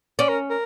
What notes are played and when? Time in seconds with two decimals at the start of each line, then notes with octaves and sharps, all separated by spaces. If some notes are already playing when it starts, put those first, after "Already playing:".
0.19 C#4 D5
0.29 A#4
0.50 A#4